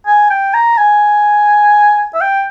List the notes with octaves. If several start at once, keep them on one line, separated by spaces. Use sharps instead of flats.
G#5
G5
A#5
G#5
E5
G5